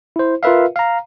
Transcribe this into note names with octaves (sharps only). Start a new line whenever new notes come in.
E4 C5
F4 A#4 B4 E5 F5
F5 A#5